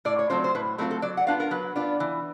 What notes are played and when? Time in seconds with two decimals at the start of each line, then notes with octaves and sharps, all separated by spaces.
0.05 A2 D5
0.19 C#5
0.30 F#3 A3 C4 F4 C5
0.44 C5
0.55 A2 B4
0.78 F#3 A3 C4 F4 A#4
0.91 A4
1.02 F#3 D5
1.17 F#5
1.27 B3 D4 F4 F5
1.40 A#4
1.51 F#3 B4
1.75 B3 D4 F4
2.00 E3